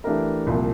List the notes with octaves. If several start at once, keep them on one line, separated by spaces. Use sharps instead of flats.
E3 A3 D4 G4 A#4
C2 A#2 F3